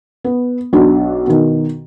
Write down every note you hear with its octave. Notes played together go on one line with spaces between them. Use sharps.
B3
B1 D4 F#4
B2 D#3